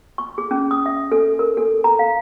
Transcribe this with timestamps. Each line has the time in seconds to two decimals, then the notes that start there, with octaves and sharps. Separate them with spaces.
0.18 C#6
0.38 G#4
0.51 C#4
0.71 D#6
0.86 E5
1.12 A4
1.39 A#4
1.57 A4
1.84 A#5
1.99 F5